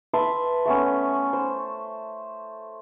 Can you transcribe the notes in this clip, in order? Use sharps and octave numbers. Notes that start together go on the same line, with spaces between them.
B4 E5 A5 C6
A3 B3 C#4
C5